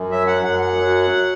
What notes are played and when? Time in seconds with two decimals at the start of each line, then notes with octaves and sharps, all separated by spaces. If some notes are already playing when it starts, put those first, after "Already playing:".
Already playing: F#2
0.11 F#3 E5
0.27 F#5
0.44 F#2 F#5
0.60 F#5
0.78 F#3